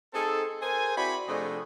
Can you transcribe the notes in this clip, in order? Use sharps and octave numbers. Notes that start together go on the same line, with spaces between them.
C4 D#4 G#4 A4
G#4 A#4 C5 G#5
C4 E4 F#4 D5 B5
C3 F3 A3 D4 G#4 D#5